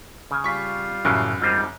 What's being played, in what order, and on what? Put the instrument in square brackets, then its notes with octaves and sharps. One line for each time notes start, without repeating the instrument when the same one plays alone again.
[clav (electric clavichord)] C#3 G#5
[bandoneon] G3 F4 [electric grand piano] C#6 B6
[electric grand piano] F#2 [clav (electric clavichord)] A2 C#3 E3
[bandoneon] G#2 D#3 [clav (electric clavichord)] G3 C4 F4